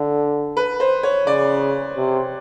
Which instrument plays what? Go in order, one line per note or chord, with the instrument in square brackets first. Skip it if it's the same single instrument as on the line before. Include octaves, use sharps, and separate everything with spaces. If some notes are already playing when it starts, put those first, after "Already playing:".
Already playing: [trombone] D3
[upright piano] B4
C5
C#5
[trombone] C#3 [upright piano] D5
[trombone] C3